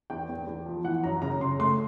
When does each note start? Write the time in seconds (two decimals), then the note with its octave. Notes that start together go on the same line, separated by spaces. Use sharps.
0.10 E2 G5
0.29 E2
0.47 E2
0.66 F3
0.84 E3 F#5
1.04 F#2 A#5
1.22 C#3 A#5
1.40 C#3 C6
1.59 A3 C6